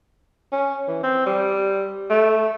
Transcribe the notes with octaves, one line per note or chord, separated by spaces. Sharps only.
C#4
E3
C4
G3
A3